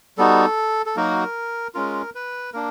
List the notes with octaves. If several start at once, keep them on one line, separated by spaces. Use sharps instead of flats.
G3 B3 D#4 F#4 A4
A4
F#3 A#3 D#4 F#4 A#4
G#3 C#4 F4 A#4
B4
A#3 D4 A#4